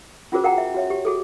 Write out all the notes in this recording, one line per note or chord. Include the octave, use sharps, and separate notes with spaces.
C#4 F4 F#4 G#4 A#4 C5
A#4 F#5 G5 A#5
E5
F#4 C#5 E5
G4
F#4 G#4 A4